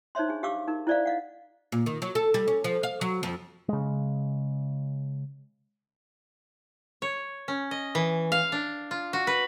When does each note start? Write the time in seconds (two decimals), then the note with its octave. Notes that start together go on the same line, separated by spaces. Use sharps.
0.15 D#4 C5 C#5 E5 C6
0.28 D4 G#4
0.43 G4 F5 C#6 D6 E6
0.68 D#4 A#4
0.87 E4 C5 D5 E5 F5
1.06 D#5 F5 F#5
1.72 A#2
1.86 D#3
2.02 F#3
2.15 A4
2.34 G3
2.48 C#4
2.64 F3
2.83 F5
3.01 F#3
3.23 F2
3.69 C#3 G#3
7.02 C#5
7.48 C#4
7.71 D#5
7.95 E3
8.32 F5
8.52 D4
8.91 F4
9.13 F#4
9.27 B4